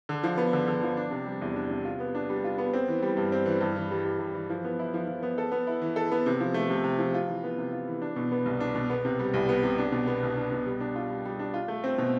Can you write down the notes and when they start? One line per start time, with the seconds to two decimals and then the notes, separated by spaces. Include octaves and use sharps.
0.09 D3
0.24 F3
0.38 B3
0.53 D3
0.67 D3
0.83 F3
0.97 D4
1.11 C3
1.26 G3
1.42 E2
1.56 D4
1.71 C3
1.85 F4
2.00 B3
2.15 D4
2.29 G3
2.44 F4
2.58 B3
2.73 C4
2.88 E3
3.02 G3
3.17 G2
3.32 C4
3.46 E3
3.61 G2
3.76 E3
3.91 G3
4.05 G2
4.19 G2
4.34 E3
4.50 F3
4.64 B3
4.79 E4
4.94 F3
5.07 F3
5.23 B3
5.38 A4
5.52 B3
5.67 E4
5.82 E3
5.96 A4
6.11 B3
6.26 C3
6.40 F3
6.54 A3
6.70 C3
6.84 C3
6.99 F3
7.14 F4
7.28 E3
7.43 B3
7.58 C3
7.73 F4
7.87 E3
8.02 D4
8.16 B2
8.31 B3
8.45 C2
8.60 D4
8.75 B2
8.90 B3
9.05 C3
9.19 G3
9.34 C2
9.49 B3
9.63 C3
9.78 D4
9.92 B2
10.07 B3
10.23 C2
10.36 D4
10.52 B2
10.66 G3
10.81 D4
10.96 F4
11.10 G3
11.25 G3
11.39 D4
11.54 F4
11.68 A3
11.84 C4
11.98 B2